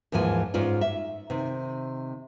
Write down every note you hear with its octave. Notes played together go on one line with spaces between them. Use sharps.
D#2 G#2 E3 F3 G#5
G#2 C#4 F4 D5
E5
C3 D#3